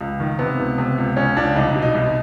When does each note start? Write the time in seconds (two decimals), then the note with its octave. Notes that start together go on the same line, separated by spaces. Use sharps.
0.01 C#2
0.20 D#3
0.39 C3 B3
0.59 C#2
0.78 C3
0.98 C#2
1.17 C#2 C#4
1.36 C#2 D4
1.56 C2 D#4
1.69 D#4
1.75 B2
1.82 D#4
1.95 C2